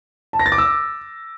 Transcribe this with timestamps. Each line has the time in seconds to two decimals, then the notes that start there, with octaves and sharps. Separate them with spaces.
0.33 A5
0.39 A#6
0.46 A6
0.52 D6
0.58 E6